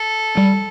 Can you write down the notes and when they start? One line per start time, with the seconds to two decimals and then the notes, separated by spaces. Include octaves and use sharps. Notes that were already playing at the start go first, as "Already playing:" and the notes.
Already playing: A4
0.37 G3